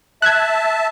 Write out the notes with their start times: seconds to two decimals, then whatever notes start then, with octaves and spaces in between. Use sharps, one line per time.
0.22 E5 A5 F#6 G#6